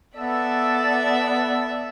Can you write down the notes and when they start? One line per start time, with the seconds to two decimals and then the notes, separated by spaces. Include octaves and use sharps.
0.16 B3 A4 D5 E5